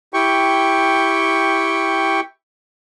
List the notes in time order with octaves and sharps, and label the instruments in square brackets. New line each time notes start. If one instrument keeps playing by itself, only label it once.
[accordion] E4 G4 G5 C#6